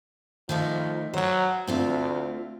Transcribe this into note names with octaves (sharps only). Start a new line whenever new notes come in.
D#3 F3 A3 D#4
F#3 C5 F#5
D2 A3 C4 F4